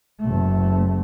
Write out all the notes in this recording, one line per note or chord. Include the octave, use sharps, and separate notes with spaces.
F#1 A3